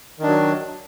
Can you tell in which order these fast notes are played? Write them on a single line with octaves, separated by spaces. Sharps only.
D#3 D4 F#3